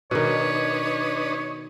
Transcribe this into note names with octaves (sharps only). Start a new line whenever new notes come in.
B2 D#3 D4 B4 C#5 D#5